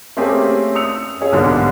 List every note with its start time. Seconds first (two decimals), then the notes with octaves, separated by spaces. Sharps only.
0.17 A3 A#3 C4 C#4 G4 G#4
0.75 D#6 E6 C#7 F7
1.20 C#4 F4 G#4 C#5
1.32 B1 G#2 D3 F#3 G3 A#3